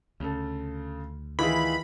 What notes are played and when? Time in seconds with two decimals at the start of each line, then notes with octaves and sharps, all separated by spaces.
0.20 D2 C#3 A4
1.39 D#3 E3 E4 F4 G#4 B5